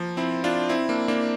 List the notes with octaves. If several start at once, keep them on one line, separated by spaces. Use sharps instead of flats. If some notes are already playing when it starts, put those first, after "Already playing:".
Already playing: F3 A#3
C4 E4
D4 F4
C4 E4
A#3 D4
A#3 D4